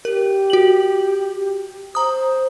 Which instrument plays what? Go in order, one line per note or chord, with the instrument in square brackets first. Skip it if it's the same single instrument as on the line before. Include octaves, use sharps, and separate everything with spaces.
[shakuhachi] G4 [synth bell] A#4
[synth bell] F#4 F#7
[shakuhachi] C5 [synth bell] A#5 D#6